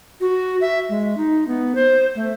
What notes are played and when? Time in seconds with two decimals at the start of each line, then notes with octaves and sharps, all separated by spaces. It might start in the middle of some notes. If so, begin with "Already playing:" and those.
0.21 F#4
0.61 E5
0.89 G#3
1.17 D#4
1.48 B3
1.75 C5
2.15 A3